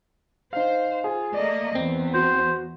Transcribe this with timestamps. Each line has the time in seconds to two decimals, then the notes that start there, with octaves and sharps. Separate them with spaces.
0.53 D#4 C5 F5
1.04 F4 G#4
1.34 A3 A#3 D5 D#5
1.75 E2 B3 C4
2.14 F#4 C5